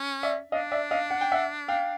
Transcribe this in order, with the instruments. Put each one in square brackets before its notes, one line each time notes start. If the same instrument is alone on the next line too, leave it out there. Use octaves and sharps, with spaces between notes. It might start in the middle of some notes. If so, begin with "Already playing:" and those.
Already playing: [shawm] C#4
[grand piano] D5 E5
[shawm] D4 [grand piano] D#5 F5
[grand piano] D5 E5
D#5 F5
F#5
G5
E5 F#5
F5 G5